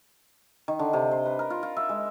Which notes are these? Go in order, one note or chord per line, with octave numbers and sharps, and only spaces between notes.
D#3
D3
C3
C5
B4
A#4
F4
F4
E5
G#3